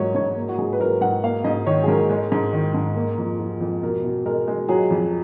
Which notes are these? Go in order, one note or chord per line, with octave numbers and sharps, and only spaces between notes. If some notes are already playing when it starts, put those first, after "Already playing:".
Already playing: G#2 F#3 A#3 C#5 D#5
G#2 C#5
A#3
F#4
G#2 G#4
B4
F#3 A#4
G#2 F#5
A#3 F5
G#2 D#5
D#3 C#5
G#4
G#2 A#4
G#3
G#2
D#3
G#2
A#3
F2
F3
F2
B2 A#4
B2
G#3 A#4
G#3
F#3 G#4
F2